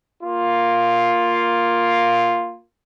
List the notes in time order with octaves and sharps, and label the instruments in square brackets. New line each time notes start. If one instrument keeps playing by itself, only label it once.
[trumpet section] A#3 F4